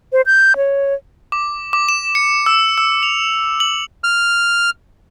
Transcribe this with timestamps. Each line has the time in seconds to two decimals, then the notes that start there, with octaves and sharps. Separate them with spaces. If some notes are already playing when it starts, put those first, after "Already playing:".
0.12 C5
0.26 G6
0.57 C#5
1.32 D6
1.73 D6
1.89 E7
2.15 C#7
2.46 E6
2.78 E6
3.03 F7
3.60 F#7
4.04 F6